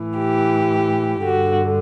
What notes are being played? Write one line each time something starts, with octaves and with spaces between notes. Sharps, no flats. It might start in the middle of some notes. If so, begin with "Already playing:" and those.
Already playing: A2 E3
G4
G2 D3 F#4